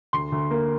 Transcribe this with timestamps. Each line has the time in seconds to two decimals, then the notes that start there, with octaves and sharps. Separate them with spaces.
0.13 D2 C6
0.32 D2
0.51 A#3